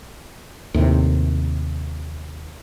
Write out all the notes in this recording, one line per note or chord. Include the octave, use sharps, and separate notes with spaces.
D#2 A2 C3